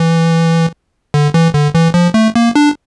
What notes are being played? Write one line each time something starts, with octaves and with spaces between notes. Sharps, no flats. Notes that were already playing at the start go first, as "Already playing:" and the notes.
Already playing: E3
D3
E3
D3
E3
F3
A3
A#3
D4